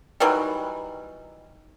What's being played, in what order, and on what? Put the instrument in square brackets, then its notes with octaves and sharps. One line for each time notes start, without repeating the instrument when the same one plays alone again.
[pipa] D#3 E3 F#3 G3